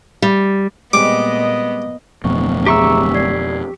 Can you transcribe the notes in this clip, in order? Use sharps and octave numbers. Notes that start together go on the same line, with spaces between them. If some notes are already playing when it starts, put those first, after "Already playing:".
G3
A#2 G3 G#3 B3 C4 D#5 D6
D1 F2 B2 C#6
G4 G#4 E5 A#5 C#6 E6
D5 G#6 C7